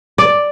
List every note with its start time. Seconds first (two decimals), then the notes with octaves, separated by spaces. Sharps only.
0.18 D5